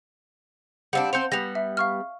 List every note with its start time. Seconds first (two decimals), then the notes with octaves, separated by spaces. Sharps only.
0.93 G3 C4 D4 F5 F#5
1.13 C4 C5 G6 C#7 F7
1.32 G3 B3 A#6 F7
1.55 E5
1.77 F5 C#6 F6